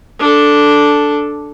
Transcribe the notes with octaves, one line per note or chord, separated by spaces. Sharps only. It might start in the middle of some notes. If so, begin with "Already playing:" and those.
D4 A4